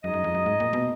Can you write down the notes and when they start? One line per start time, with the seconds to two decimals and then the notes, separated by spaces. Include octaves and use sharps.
0.03 F#2 G#3 D#4 G#4 D#5
0.14 F#2
0.24 F2
0.35 F#2
0.46 G#2
0.60 A#2
0.73 B2